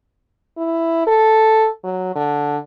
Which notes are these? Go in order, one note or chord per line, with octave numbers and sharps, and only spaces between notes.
E4
A4
F#3
D3